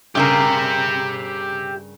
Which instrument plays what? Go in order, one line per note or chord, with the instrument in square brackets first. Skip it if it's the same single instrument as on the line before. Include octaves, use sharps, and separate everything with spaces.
[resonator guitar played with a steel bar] G2 C#3 A#4 [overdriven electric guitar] G4 E5